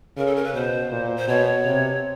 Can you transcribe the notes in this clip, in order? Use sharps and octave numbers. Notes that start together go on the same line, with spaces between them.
C#3 A#4
A4
A#4
B4
B2 C5
A#2
C5
B2 C#5
C3